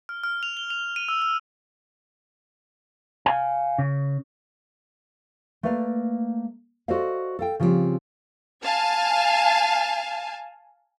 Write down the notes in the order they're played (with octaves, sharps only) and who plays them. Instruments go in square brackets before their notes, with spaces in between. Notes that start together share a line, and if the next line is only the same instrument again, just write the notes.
[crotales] F6
F6
F7
G7
F7
D#7
E6
E6
[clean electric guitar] F5 G#5
C#3
[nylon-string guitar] A3 A#3 B4 D5 F5
F#4 A4 C5 D5 D#5 F5
A4 F5 G5
C#3 F3 G3 A#3 C4
[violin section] F5 G#5 A5